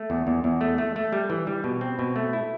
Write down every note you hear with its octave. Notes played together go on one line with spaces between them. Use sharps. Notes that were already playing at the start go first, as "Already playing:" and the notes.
Already playing: A3
E2
E2
E2
A3
A3
A3
G3
E3
G3
B2
C4
B2
A3
E4